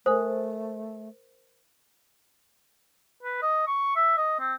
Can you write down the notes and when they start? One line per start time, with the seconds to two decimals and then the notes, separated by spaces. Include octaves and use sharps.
0.06 A3 A#4 C5 G#5 D#6
3.23 B4
3.42 D#5
3.67 C#6
3.96 E5
4.17 D#5
4.40 C4